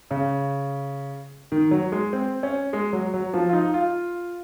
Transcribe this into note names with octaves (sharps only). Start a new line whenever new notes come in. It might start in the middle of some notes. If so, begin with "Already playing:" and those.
C#3
D#3
F#3
G#3
C4
C#4
G#3
F#3
F#3
F3
F4
D#4
F4